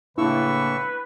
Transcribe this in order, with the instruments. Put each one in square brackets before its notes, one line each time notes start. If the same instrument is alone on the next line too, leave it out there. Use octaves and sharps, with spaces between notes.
[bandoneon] A2 C#6 E6 [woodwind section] C#3 A#3 D4 [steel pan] E4 [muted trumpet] B4